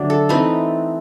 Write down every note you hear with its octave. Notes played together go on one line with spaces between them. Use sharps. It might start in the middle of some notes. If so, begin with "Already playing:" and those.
Already playing: D3 F#3 A3 D4
A4
E3 A3 C4 D#4 B4